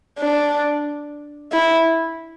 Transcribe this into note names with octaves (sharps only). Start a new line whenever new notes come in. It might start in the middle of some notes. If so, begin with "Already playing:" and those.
D4
E4